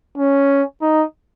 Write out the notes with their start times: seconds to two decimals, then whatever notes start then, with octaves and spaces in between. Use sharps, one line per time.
0.18 C#4
0.82 D#4